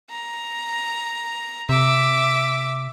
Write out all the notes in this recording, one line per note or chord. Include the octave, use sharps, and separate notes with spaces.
A#5
C3 E5 D6